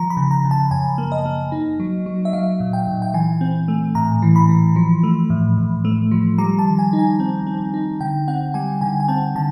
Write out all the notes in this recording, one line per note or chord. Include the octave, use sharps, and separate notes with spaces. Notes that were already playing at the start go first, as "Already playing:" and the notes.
Already playing: F3 A#5
B5
C#3
A#5
C#3
A5
F#2 G#5
A#3
D#5
A#3
D#4
F#3
F#3
E5
F#3 F5
A#2
G5
A#2
G5
E3 G#5
C4
A3
A2 A#5
E3
B5
E3
F3
A3
A2
A2
A3
F3
G3 A#5
A5
D#3
G#5
D#4
G#5
C4
C4
D#4
D3 G5
C4 F#5
G3 G#5
D3 G#5
G#5
C4 A5
D3 A5